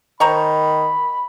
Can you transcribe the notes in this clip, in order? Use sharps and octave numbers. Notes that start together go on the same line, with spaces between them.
D#3 C5 A#5 B5 C#6